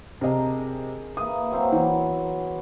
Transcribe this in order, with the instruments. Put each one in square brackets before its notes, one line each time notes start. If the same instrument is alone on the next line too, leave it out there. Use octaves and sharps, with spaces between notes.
[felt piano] C3 D#5 [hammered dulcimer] D4 G#4 A#4
[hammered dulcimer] E3 A#3 [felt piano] D#6
[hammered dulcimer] F#3 A#3 C4
[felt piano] E3 [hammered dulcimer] B3